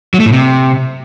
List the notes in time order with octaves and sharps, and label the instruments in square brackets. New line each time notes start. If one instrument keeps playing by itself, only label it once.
[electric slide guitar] F#3
A3
A2
C3